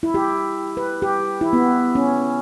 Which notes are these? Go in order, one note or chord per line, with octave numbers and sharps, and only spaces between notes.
E4
G4
B4
G4
E4
B3
C#4